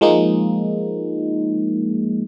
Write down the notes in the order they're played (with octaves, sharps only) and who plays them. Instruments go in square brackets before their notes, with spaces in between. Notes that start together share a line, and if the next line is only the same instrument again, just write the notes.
[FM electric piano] F3 G#3 A#3 D#4